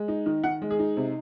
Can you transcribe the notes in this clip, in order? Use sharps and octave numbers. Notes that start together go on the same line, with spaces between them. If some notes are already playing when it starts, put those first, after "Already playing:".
Already playing: G#3
D#4
D#3
D#3 F#5
G#3
G#4
D#4
C3